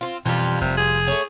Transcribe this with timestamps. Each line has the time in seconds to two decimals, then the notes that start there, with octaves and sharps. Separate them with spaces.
0.01 C4 F4
0.26 F2 B2 E3 G3 F4
0.61 F1 C3
0.77 G#4
1.08 A3 C#5